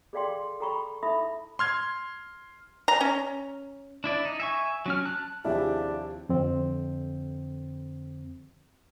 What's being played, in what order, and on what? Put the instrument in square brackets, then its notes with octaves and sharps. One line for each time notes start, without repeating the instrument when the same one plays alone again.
[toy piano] G#4 A4 D5 F5 G5 C6
A4 G5 A#5 B5 C#6
D#4 E4 A4 E5 B5 D#6
[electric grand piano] C6 F6 G#6
[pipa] A#5
C#4
[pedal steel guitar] D4 E4 D5
D#4
E5 G#5 C#6
F#3 C#4 F6
A5 F#6
[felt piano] D#2 C3 F3 [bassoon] D4 [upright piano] E4 G#4 [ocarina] G4
[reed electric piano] F2 D3 C4